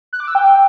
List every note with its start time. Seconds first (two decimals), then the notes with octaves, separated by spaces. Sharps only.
0.13 F#6
0.20 D6
0.27 E6
0.35 G5